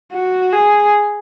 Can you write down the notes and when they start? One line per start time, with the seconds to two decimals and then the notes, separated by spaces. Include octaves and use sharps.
0.12 F#4
0.53 G#4